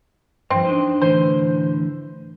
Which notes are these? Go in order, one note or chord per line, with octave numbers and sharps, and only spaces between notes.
G2 F3 C4
D4 D#4 C5
A2 D3 E3 C5